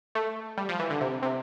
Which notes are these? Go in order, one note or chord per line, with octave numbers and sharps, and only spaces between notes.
A3
G3
F3
E3
D3
C3
C3